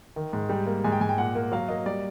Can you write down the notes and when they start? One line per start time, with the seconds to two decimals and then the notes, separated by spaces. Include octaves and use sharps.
0.16 D#3
0.33 G#2
0.49 G3 G5
0.66 A#3
0.84 G#2 G#5
0.92 G5
1.01 G#2 G#5
1.09 G5
1.18 A#2 F#5
1.35 A#3
1.52 F#3 F5
1.69 A#3 D#5
1.86 G3 D5